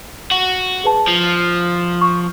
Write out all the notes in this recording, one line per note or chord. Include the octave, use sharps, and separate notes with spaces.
F#4
G#4 B4 A5
F3 F7
C#6